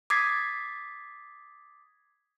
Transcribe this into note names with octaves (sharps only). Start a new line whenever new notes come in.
D6 D#6 G#6 A6 B6 C7